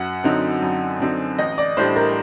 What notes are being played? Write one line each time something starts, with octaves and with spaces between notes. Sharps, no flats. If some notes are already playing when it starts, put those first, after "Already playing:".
Already playing: F#2 F#5
D3 F#3 C4 D#4
F#2
D3 F#3 C4 D#4
A1 D#5
D5
A2 G3 D4 C5
A#4